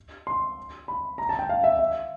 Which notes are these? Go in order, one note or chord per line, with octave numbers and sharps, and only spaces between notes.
C6
B5
A#5
A5
G5
F5
E5
E5